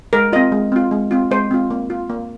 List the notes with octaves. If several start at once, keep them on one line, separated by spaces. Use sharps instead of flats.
G#3 A#4
C4 F4 D#5
G#3
C4 F4
G#3
C4 F4
G#3 C5
C4 F4
A#3
F4
A#3